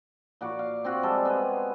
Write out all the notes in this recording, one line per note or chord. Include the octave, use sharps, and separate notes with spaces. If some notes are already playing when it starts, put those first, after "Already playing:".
A#2 F#4 D5 C#6
F5
C4 F4 F#4
G3 G#3 A4
B3 G#5